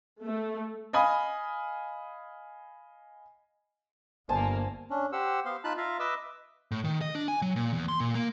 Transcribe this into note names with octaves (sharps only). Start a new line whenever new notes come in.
A3
D#5 F5 G#5 B5 D#6
G1 A#3 C5 G#5 A5
C#4 D4
G4 C5 F#5 E6
B3 C5 F5 C6
D#4 F4 A5 B5 F#6
F4 E5 F5 A#5
B4 D#5 E5 D6 E6
A2
D#3
D#5
D4
G#5
F#3
A#2
E2
C6
A#2
A#3